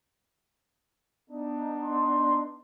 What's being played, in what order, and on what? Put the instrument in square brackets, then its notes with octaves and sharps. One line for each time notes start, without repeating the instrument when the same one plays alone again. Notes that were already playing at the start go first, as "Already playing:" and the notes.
[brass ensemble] B3 D4 D#4
[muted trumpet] C6